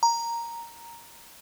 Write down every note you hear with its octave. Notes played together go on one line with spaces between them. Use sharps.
A#5